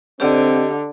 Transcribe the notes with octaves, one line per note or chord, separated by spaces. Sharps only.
D3 C4 G4 D5 D#5